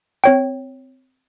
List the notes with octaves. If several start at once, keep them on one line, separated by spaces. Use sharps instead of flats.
C4 C#5 G5